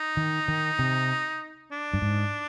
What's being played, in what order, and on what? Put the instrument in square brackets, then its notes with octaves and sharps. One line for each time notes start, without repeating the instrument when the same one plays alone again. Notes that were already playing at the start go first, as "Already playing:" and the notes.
Already playing: [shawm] D#4
[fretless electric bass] D#3
D#3
C3
[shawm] D4
[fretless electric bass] G2
G#2